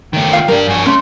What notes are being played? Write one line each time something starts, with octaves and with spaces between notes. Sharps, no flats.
D#3 A3 G5
F4 F5
G3 D4 A#4
G2 F#4 G#5
A3 C#4 C6